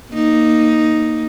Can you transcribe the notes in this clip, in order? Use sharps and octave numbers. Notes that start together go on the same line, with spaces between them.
A#3 D#4